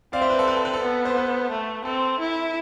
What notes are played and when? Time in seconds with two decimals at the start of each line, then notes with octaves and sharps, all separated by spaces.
0.13 C4 D5 F5
0.21 C5 E5
0.30 B4
0.39 A4
0.48 B4
0.56 A4
0.65 B4
0.74 A4
0.82 B3
1.05 C5
1.17 B4
1.51 A3
1.85 C4 A4
2.20 E4